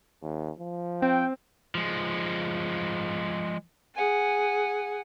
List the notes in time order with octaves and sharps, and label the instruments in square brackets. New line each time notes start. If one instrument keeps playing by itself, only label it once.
[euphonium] D#2
F3
[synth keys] C4 [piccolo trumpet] G5
[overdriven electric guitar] F3 G#3
[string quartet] G#4 F#5 G#5